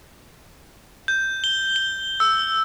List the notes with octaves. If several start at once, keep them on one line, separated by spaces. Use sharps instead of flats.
G6
G7
G7
E6